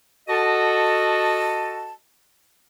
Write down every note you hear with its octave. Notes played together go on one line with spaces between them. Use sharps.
F#4 A4 D#5 A5